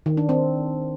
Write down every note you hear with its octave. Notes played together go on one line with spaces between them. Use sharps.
D#3
D4
C4